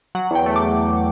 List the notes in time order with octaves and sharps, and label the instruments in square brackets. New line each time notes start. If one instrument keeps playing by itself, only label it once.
[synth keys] F#3 F#5
E2 G5
A3
D6